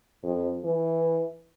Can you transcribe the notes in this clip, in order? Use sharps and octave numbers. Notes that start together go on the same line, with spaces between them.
F2
E3